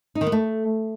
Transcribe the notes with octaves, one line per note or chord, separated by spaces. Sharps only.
D#4
D#3
B3
A3